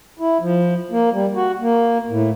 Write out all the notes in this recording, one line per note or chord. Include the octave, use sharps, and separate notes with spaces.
E4
F3
A#3
G3
F#4
A#3
A2